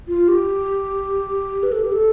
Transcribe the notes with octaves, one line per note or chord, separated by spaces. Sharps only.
F4
G4
B4
A4
G4
A4